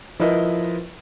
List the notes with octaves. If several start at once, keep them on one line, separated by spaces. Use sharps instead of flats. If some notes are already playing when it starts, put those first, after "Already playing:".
F3 E4 A#4 B4 D#5